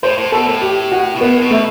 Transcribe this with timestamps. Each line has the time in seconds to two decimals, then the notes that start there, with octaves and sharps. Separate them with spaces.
0.03 A2 C5
0.18 A2
0.32 B2 A4
0.48 A2
0.62 G4
0.92 F#4
1.16 B2
1.21 A2 B3
1.41 B2
1.51 A3